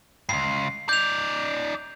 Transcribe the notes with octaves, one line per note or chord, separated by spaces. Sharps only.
C#2 G2 C7
D#4 D5 G6 F7